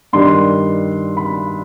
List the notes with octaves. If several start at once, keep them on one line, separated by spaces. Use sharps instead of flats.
G2 D#3 G3 D4 C6
B5